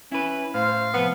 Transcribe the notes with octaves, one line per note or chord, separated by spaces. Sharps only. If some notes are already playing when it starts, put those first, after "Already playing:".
C#4 E4 B4
A2 C5 F5
C3 F3 B3